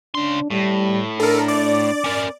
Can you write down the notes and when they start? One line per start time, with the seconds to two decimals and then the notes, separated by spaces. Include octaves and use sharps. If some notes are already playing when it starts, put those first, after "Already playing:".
0.15 C#3 D4 C6
0.50 A2 G3
1.20 D4 A4 A#4
1.48 D5
2.04 C#4 A#4